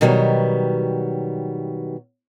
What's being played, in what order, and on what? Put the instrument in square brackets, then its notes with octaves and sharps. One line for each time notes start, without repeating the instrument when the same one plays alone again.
[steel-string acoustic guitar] B2 D#3 F#3 G3 B3